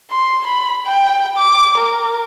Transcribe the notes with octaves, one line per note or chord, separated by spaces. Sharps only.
C6
B5
G5
D6
A#4